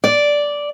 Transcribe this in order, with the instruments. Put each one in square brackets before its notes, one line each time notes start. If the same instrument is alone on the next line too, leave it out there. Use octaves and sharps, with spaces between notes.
[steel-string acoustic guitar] D5